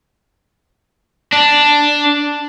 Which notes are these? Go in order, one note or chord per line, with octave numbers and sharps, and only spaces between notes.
D4